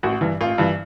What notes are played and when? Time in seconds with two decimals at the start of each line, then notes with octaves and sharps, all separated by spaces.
0.03 A1 F#4
0.21 G2 E3
0.41 A1 F4
0.58 G2 E3